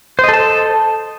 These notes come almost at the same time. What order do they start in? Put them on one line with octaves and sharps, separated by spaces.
C5 D#5 A4 A5